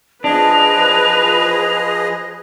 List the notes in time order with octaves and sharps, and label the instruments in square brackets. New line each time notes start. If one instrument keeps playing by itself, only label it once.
[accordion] F3 G#4 D#5 [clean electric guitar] D4 [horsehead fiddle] B4 [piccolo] F7